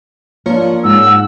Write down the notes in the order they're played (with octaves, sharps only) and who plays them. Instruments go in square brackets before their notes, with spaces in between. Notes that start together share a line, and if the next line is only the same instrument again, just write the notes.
[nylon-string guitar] F3 D4 [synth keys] A#3 F4 C#5
[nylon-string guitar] G#2 [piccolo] E6
[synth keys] F#5